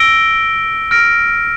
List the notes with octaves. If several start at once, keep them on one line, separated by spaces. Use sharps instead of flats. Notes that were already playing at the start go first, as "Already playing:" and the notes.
Already playing: E6 A#6 D7 G7
F6 A#6 D7